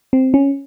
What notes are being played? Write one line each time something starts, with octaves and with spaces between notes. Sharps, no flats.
C4
C#4